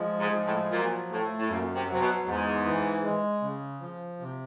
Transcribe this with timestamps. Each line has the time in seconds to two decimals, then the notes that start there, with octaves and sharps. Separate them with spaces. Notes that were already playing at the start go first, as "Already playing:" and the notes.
Already playing: F3 G#3
0.19 G#2
0.33 F3
0.45 A2
0.71 A#2 F#3
1.10 A2 A3
1.38 A2
1.48 F#2 A#2
1.74 C3
1.87 F#3
1.93 C3
2.01 B2
2.26 E2 G#2
2.65 E3
3.04 G#3
3.42 C#3
3.81 F3
4.20 C3